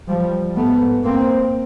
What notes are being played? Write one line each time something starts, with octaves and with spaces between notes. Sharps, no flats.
F3 G3
G#2 A3 B3
A#3 C4